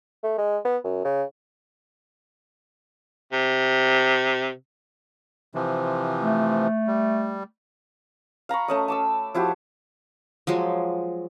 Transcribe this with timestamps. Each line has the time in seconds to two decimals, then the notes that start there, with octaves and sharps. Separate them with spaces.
0.23 A3
0.38 G#3
0.65 B3
0.84 F#2
1.05 C#3
3.33 C3
5.55 C3 E3 F3
6.22 A3
6.87 G3
8.49 F5 A#5 B5 C#6
8.68 A3 C#4 D#5
8.88 A5 D6 E6
9.34 F3 E4 F#4 G4
10.47 F3 F#3 G#3